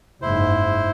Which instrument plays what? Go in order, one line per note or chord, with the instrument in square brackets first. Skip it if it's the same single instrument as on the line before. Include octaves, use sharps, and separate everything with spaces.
[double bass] F#1 G#2 [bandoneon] E4 C5